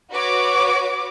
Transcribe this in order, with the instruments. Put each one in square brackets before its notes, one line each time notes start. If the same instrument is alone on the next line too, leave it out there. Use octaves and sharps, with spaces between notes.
[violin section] F#4 B4 C#5 D6